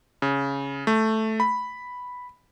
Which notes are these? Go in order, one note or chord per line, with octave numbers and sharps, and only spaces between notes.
C#3
A3
B5